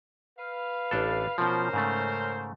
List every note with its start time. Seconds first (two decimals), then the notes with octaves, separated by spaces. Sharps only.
0.39 B4 F5
0.91 A1 D4 A4
1.38 B2 F3 C#4 A#4 C5
1.73 G#2 C#3 A3